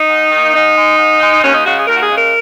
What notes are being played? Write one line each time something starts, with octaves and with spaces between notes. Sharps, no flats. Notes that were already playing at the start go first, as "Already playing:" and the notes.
Already playing: D#4
G#2
D#3 A#3
G#2 D#4
G#3
G#2
G#3
D#2 C#4
D#4
C#3 G#3 F#4
G#4
D#2 A#4
F#4
G#4
C#3 G#3
A#4